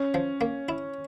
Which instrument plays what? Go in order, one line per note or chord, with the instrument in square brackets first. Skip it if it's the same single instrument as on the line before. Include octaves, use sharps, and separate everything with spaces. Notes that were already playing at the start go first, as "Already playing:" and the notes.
Already playing: [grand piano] C#4
[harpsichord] F3
A#3
E4